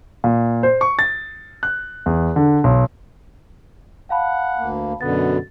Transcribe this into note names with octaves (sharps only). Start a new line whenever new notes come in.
A#2
C5
C#6
A6
F#6
E2
D3
B1
F5 F#5 A5 B5
D2 A#3
F#2 B2 D3 B3 A6